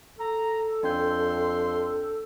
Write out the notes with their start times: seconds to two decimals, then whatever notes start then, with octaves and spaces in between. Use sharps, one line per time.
0.19 A4 A#5
0.83 F2 D4 G5 C6 G6